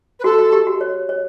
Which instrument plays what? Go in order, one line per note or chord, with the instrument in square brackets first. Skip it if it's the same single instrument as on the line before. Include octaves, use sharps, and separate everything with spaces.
[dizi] B4
[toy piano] F#4 [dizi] A4
[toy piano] F#4
G4
F#4
C#5
C#5